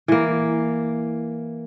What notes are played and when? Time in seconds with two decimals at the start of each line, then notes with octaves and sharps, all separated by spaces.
0.08 E3 A#3